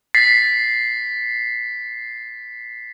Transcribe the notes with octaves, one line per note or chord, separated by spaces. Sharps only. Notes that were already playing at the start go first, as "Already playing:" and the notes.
A6 B6 C7